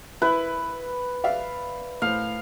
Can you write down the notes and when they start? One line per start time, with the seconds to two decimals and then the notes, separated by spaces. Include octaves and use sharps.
0.22 E4 B4
1.24 D5 E5 F5
2.02 A2 C5 F5